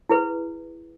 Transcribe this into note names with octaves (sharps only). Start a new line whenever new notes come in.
E4 G#4 B4